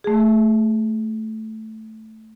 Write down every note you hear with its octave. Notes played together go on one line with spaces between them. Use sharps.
A3 G#4